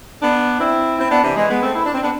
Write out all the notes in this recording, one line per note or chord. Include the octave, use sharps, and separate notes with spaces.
B3 D4
C4 E4
C4 E4
B3 D4
C3 E3
E3 G#3
G#3 B3
A3 C4
E4
D4
C4
B3 D4